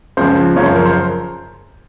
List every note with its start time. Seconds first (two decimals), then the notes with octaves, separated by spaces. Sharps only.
0.17 C#2 C#3 F3 C5
0.56 F#2 C#3 F3 C#5
0.66 C5
0.75 A#4
0.86 C5